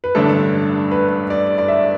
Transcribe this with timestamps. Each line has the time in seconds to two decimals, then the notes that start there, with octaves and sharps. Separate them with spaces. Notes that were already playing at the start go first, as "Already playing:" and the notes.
0.04 B4
0.15 A1 G2 D3 A3 D4 A4
0.91 B4
1.30 D5
1.58 D5
1.68 E5